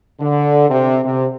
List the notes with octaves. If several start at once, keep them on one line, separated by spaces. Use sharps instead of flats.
D3
C3
C3